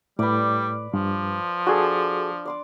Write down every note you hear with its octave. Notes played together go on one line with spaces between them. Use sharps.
A2 G3 B4 D5
G2 F3
D4 F#4 G#4 A4
D5 C6 D6